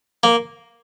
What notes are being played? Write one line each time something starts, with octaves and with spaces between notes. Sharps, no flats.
A#3